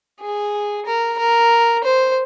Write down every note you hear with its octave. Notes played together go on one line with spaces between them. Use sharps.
G#4
A#4
A#4
C5